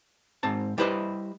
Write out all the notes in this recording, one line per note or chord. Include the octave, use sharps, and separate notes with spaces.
G#2 C4 A5
G3 E4 G4 B4 C5 D#5